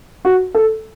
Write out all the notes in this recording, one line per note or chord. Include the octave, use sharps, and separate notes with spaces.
F#4
A4